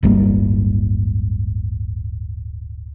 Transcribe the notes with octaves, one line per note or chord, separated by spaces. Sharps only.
D1 G1 G3 A#3